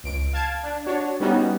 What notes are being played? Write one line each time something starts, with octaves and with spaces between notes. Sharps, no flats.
C#2 D7
F5 A5 G#6
D4
D4 F#4 C#5
G3 B3 C#4 D#4 F#4